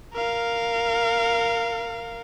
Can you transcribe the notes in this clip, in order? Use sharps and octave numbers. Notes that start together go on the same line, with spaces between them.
A#4 F5